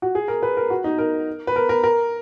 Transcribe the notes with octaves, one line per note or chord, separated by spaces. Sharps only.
F#4
G#4
A#4
B4
A#4
F#4
D#4
A#4
B4
A#4
A#4
A#4